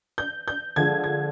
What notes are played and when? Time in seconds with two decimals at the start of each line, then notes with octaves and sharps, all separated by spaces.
0.18 G6
0.48 G6
0.76 D3 F3 G#3 G#6
1.04 G#6